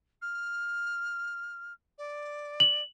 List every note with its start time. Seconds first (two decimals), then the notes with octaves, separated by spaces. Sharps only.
0.22 F6
1.98 D5
2.60 F#7